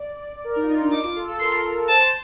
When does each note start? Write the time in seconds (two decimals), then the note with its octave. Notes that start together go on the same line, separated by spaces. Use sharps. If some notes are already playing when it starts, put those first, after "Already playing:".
Already playing: D5
0.44 A#4
0.56 D#4
0.63 F4
0.69 D#4
0.81 D4
0.92 D#4 D6
1.04 F4
1.16 A4
1.28 A4
1.40 A#4 C6
1.88 C5 A5